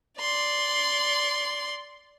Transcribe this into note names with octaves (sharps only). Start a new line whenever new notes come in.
D5 C6